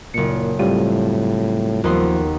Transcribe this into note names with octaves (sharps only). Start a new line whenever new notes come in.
F#1 A#2 C#7
A2 G3 C4 F4 D#7
D#2 F3 B3 C6